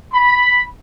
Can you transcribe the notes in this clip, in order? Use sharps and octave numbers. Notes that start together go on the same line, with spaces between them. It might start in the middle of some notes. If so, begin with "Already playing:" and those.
B5